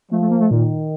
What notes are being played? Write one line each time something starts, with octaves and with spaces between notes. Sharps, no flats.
F3 A3
A3
A#3
A3
A#2 D#3